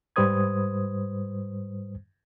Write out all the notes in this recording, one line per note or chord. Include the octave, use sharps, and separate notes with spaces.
G#2 G3 B4 C5 D#6 G#6